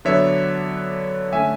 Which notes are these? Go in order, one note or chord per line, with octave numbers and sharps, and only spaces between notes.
D3 F#3 B3 D4 C#5 E5
D3 A3 C#4 E5 G#5